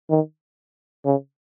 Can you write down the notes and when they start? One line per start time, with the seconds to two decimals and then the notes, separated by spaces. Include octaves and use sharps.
0.10 D#3
1.05 C#3